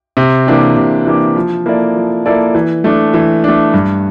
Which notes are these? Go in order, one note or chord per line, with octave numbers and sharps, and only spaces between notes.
C3
E3 A#3 D4 G4
C3
E3 A#3 D4 G4
F3
A#3 E4 A4 D5
F3
A#3 E4 A4 D5
E3
A3 D4
E3
A3 D4
G2